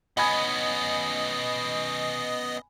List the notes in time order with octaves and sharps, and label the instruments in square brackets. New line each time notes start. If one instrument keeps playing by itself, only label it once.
[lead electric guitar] B3 C#4 [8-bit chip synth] D#5 [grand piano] G#5 B5 G#6